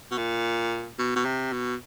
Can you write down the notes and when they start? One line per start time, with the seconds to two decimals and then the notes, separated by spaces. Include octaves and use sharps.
0.11 B2
0.18 A#2
0.98 B2
1.15 B2
1.25 C3
1.52 B2